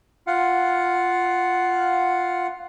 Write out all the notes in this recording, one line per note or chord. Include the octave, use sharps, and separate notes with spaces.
F4 F5 F#5